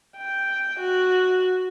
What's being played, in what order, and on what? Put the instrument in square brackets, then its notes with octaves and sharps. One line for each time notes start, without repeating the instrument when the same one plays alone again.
[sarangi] G5
F#4